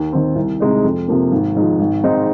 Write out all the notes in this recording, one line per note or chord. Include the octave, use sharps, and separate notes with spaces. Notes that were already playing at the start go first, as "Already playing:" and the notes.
Already playing: D#2
D#3 C4
C2
C3 G#3 D#4
F2
C3 F3 A#3
G#1
G#2 F3
G#1
G#2 G#3 C4 D#4